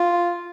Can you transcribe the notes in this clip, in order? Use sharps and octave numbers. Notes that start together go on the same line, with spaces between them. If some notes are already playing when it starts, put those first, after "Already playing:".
Already playing: F4